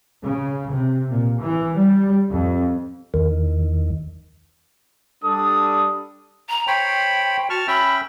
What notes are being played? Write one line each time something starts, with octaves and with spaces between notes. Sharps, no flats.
C#3
C3
A#2
E3
G3
F2
E2 D#3
G3 D4 A4 D#6
A#5
C5 C#5 G5 B5
F#4 A5 C#6 F6
C#4 E5 G5 B5